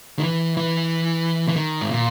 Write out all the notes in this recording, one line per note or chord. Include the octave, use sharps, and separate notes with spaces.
D#3
E3
E3
E3
D#3
G#2
A#2